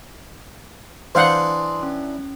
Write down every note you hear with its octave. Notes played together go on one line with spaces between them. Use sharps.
E3 D4 C5 F5 F#5 C6 D#6
C#4